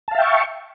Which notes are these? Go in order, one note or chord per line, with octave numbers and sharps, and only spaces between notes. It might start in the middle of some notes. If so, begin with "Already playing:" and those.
E5 F5 G5 A5 C#6